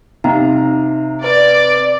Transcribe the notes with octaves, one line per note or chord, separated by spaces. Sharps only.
C3 D#4 F5 A#5
B4 D5